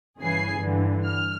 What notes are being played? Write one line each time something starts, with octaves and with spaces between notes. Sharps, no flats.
G1 C#3 E3 G#4 G#5 C7
G2 D3 E3
F6